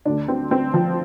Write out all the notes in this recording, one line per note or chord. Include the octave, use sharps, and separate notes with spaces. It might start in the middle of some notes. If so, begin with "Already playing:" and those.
D2 D3 D4
C4
C4
F3